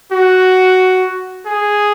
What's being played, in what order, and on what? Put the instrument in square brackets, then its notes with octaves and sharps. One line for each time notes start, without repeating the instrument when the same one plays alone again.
[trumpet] F#4
G#4